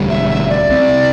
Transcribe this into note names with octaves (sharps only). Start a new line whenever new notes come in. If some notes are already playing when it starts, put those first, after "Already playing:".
Already playing: E1 D2 D3 G3
E5
E5
D5
C2 C3 G3 C4